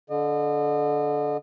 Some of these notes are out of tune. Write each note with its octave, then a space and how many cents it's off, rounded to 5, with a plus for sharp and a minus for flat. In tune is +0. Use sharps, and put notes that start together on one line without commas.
D3 -20 D#5 -40